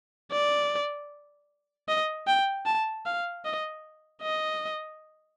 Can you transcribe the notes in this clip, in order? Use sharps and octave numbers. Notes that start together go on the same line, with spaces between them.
D5
D#5
G5
A5
F5
D#5
D#5